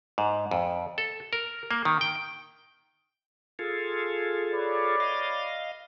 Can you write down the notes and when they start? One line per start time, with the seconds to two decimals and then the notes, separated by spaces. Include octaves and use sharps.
0.18 G#2
0.51 F2
0.98 A4
1.33 A#4
1.71 A#3
1.85 D#3
2.01 G5
3.59 F4 G#4 A4
4.52 B4 C#5 D5
5.00 D#5 F5